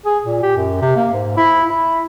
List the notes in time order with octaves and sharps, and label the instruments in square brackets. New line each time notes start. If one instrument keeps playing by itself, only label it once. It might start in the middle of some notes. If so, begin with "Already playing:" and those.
[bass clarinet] G#4
A#2
G4
F#2
C3
A#3
G#2
E4
E4